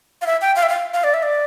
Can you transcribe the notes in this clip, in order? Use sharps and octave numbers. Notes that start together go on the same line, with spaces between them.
F5
E5
G5
F5
E5
F5
F5
D5
E5
D5